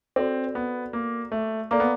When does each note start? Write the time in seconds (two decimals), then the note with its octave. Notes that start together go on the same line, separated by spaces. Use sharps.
0.16 C4 F#4 A4 D5
0.55 B3
0.93 A#3
1.32 A3
1.71 A#3 A4 D5 F5 A#5 D6
1.80 B3